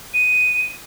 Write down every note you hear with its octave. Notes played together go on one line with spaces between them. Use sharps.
D#7